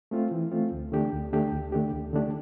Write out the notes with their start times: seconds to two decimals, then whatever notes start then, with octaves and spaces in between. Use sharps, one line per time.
0.11 A3 C4 F4
0.31 E3
0.52 A3 C4 F4
0.72 D2
0.92 D3 A3 D4 G4
1.12 D2
1.33 D3 A3 D4 G4
1.52 D2
1.72 D3 A3 D4 G4
1.93 D2
2.13 D3 A3 D4 G4